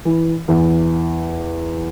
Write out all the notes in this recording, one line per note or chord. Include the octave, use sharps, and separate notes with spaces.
E3
E2